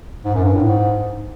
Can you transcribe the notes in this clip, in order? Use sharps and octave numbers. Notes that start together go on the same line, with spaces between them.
G#2
F#2
G2
A2
G#2